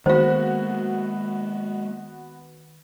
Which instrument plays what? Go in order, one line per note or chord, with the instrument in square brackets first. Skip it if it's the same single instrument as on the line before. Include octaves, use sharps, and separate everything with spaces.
[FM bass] D#3 [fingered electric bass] G#3 A#3 [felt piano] B3 F#4 [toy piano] C5 F5